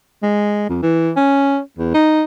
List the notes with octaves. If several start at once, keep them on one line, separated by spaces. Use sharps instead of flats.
G#3
F2
E3
C#4
E2
D#4